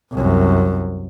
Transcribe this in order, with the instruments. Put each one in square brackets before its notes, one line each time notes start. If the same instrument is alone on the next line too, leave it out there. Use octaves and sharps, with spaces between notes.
[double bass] C2 F#2